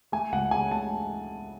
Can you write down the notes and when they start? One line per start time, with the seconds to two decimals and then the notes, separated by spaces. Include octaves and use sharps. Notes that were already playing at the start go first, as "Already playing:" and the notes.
0.12 A3 G#5
0.32 C#2 F#5
0.51 C#3 G#5
0.71 A3 A5